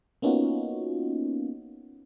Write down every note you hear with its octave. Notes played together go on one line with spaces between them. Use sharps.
A#3 B3 C#4 D#4 F4 F#4